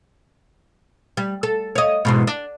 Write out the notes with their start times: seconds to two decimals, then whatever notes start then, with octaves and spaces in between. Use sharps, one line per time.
1.17 G3
1.43 A4
1.75 C#5 D#5
2.05 E2 G#2 B2
2.27 D4